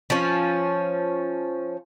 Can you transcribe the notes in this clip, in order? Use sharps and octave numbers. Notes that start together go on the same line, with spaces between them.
F3 C#4